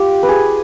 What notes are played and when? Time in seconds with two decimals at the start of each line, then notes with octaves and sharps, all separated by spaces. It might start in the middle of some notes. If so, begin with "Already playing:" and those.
Already playing: F4 G4
0.23 B4
0.29 G#4